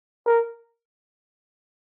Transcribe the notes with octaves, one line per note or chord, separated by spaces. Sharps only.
A#4